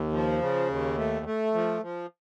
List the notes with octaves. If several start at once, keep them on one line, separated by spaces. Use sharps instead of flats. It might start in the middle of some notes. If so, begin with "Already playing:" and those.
Already playing: D#2
F3
C#3
D#2
A3
A3
F3
F3